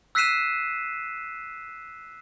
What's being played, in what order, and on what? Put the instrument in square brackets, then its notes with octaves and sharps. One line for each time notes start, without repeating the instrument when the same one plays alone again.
[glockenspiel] E6 F#6 B6 C7 D#7 E7